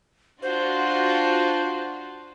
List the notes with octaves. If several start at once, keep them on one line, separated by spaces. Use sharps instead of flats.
D4 F4 F#4 C5